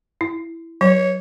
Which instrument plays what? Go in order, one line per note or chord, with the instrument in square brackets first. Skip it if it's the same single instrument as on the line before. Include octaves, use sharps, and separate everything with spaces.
[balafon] E4
[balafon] F#3 [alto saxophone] C#5